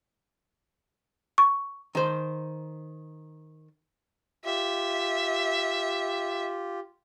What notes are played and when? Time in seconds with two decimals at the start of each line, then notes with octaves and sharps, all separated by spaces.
1.38 C#6
1.95 D#3 C5
4.45 F4 G4 E5